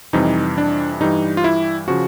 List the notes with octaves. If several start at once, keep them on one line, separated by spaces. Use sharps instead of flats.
F2 C3 E3 G3 D#4
D4
G2 E3 G3 D#4
F4
E4
C#3 F3 F#4